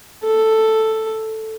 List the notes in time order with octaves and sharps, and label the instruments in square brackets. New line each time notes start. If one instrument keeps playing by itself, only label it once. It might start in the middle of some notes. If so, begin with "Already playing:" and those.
[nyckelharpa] A4